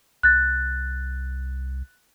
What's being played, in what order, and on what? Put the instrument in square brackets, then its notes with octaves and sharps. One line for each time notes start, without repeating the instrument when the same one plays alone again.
[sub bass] C2 [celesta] F#6 A6